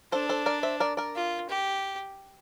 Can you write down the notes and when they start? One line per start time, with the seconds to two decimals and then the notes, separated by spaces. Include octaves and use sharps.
0.12 D4 A4 C5
0.29 A4 C5
0.46 A#4 D5
0.63 C5 E5
0.80 A#4 D5
0.97 A#4 D5
1.15 F4
1.49 G4